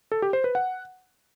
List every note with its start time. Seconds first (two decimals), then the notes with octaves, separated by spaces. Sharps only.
0.12 A4
0.22 G4
0.33 C5
0.44 B4
0.55 F#5